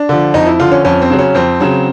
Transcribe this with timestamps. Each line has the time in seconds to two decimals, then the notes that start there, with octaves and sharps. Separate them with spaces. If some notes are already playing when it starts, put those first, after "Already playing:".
Already playing: D4
0.09 D3 F3
0.34 F2 D#4
0.46 E4
0.59 D3 F3 F4
0.71 C#4
0.85 F2 C#4
1.02 C4
1.10 C#3 F#3
1.19 C#4
1.35 F2 C4
1.60 C#3 F#3